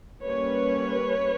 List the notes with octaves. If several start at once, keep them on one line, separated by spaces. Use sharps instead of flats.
G3 A#3 C#4 B4 C#5